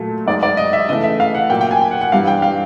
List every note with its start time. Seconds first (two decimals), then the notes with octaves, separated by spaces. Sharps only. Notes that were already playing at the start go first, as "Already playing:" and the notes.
Already playing: A#2 F#3 A3
0.27 F#2 D#3 G#3 D5
0.43 D5
0.57 D#5
0.73 E5
0.89 C#3 E3 A3 D#5
1.03 E5
1.20 F5
1.35 F#5
1.50 A#2 F#3 A#3 G5
1.61 G5
1.71 G#5
1.82 G5
1.91 F#5
2.01 F#5
2.12 G2 E3 G3 F5
2.27 G5
2.42 F5